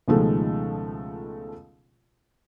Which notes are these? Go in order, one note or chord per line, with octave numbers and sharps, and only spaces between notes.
C#2 B2 D#3 F3 G#3 A3